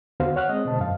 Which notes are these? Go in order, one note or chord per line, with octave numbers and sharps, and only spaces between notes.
D#2 D3 B3 F#4 C5 F5
C#5 F#5 F6 F#6
G#3 C4 D#5
B2 D3 C5 D#5 A5
F#2 F5